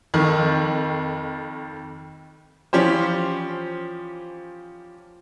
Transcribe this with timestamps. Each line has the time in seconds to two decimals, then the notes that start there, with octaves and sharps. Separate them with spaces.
0.14 F2 D#3
2.73 E3 F3 C#4 G4 C5